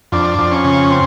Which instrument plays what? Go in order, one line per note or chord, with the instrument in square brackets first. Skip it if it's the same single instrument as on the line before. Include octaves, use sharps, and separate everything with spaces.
[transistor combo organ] F2 D4
F2
C#4
C#3
C4